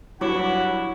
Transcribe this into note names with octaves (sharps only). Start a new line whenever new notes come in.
G2 F#3 E4 C#5 F#5 D6